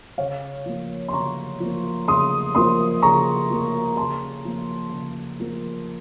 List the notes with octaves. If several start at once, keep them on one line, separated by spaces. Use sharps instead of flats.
C#3 C#5 F5
F3 A#3
C6
C#3 A#5 C#6
F3 A#3
C#3 C6 D#6
F3 A#3 C6 D#6
C#3 A#5 C#6
F3 A#3
C#3 A5 C6
F3 A#3
C#3
F3 A#3